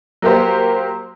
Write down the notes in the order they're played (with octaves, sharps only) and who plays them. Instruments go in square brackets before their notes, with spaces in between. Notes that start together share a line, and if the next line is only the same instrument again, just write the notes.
[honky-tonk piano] F#3 A#3 G4 C5